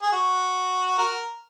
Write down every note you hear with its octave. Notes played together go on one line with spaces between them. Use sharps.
G#4
F#4
F#4 A#4